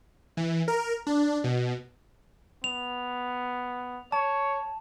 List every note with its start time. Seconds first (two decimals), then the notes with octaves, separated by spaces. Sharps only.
0.37 E3
0.68 A#4
1.07 D4
1.44 B2
2.64 B3 F7
4.12 C#5 A5